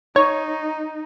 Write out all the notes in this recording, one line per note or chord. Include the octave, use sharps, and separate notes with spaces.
D#4 C#5